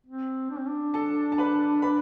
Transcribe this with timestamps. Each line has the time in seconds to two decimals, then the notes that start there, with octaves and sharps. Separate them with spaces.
0.06 C4
0.50 D4
0.58 C4
0.67 D4
0.94 A4 A5
1.32 A5
1.38 B4 B5
1.82 B4 B5